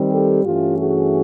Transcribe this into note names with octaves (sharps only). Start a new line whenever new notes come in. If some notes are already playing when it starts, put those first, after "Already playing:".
Already playing: D#3 G3 C4
G4 A4
G2 E3 A3 C#4 F4 G4
F#4 G#4